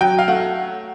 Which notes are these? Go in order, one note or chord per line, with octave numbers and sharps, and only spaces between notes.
F#3 G5
F5
A3 F#5